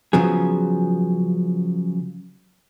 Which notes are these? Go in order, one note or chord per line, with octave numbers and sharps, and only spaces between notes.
C#3 F3 F#3 B3 G#4